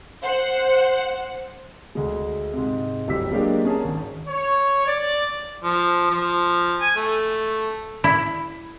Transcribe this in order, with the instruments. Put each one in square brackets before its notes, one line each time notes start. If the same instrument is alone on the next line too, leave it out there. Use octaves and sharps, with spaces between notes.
[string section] C5 F#5
[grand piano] D2 G#3
G#2 C3
D1 G1 G4 E6 B6
F#3 G#3 A#3 D4 F#4 G4
C#4 G#4 A#4 A5
G#1
[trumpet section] C#5
D5
[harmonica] F3
F3
G#5
A3
[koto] E4